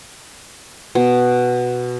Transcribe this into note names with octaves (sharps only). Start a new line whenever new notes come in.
B2